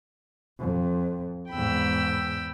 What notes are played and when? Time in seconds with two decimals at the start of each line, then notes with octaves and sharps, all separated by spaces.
0.59 F2
1.50 E2 G#2 G5 B5 E6